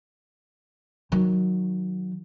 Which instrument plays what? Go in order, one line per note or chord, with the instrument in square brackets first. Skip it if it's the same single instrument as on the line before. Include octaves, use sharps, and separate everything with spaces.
[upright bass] D#3 F#3